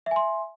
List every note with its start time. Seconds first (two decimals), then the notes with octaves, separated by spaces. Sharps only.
0.06 E5
0.11 G#5
0.16 C6